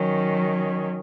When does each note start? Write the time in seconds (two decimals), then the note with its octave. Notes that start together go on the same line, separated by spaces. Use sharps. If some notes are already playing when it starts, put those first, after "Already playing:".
Already playing: D#3 F#3 C#4